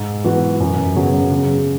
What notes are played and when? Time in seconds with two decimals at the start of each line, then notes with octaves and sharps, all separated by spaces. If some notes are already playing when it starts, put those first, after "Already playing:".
Already playing: G#2
0.24 E3 B3 F#4
0.60 F#2
0.95 C#3 F#3 B3
1.31 C#3